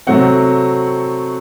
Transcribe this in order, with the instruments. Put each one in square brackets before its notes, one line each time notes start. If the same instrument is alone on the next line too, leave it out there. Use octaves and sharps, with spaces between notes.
[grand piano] C3 F#3 A3 C4 F#5